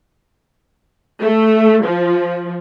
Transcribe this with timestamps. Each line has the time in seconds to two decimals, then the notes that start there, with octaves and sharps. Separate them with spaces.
1.22 A3
1.84 F3